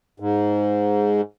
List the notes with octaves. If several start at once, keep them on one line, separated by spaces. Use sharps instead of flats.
G#2